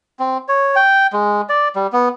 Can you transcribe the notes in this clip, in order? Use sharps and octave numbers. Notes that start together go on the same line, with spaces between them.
C4
C#5
G5
G#3
D5
G3
B3